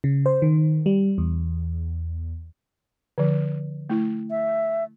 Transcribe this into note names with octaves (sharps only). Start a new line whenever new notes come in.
C#3
C5
D#3
G3
E2
D3 F3
A3 E4
E5